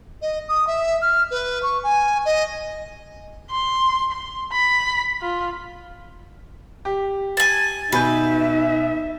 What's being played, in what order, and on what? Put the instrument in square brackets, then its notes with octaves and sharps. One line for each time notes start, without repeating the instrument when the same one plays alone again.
[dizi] D#5
D#6
E5
F6
B4
C#6
G#5
D#5
[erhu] C6
C6
B5
F4
[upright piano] G4
[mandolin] G#5 A5
[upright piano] B2 G#5 G6 [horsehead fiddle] D#4 E5 [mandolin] B4